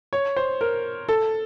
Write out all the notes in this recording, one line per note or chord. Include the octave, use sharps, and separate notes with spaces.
C#5
C5
A#4
A4